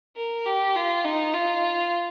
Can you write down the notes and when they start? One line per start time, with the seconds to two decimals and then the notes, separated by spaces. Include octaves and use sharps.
0.17 A#4
0.46 G4
0.76 F4
1.04 D#4
1.34 F4